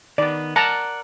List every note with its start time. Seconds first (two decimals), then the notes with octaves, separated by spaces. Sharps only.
0.18 D#3 B3 D5
0.56 A#4 D5 F#5 A5 A#5